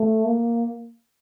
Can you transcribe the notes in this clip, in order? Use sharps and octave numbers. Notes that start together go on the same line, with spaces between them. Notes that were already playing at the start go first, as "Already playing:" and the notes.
Already playing: A3
A#3